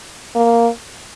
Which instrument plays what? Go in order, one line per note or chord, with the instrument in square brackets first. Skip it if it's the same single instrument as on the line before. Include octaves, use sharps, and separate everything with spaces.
[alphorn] A#3